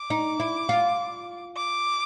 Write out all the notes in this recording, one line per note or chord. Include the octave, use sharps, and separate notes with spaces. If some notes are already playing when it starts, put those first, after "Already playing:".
Already playing: D6
D#4
E4
F4
D6